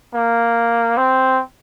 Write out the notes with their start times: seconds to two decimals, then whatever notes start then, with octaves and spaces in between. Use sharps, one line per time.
0.14 A#3
0.97 C4